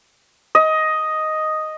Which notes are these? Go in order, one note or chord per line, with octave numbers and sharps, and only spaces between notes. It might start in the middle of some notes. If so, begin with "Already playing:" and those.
D#5